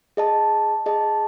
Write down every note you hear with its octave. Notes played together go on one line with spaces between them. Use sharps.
G#4 D#5 A5
G#4 D#5 A5